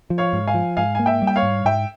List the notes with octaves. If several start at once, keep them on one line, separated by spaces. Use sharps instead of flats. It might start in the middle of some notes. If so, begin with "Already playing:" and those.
F3
C#5 F5
G#2
F5 G#5
F3
G#2 F5 G#5
A#3 G#5
E5 G5
G3
G5
C#5 F5
G#2
G#2 E5 G5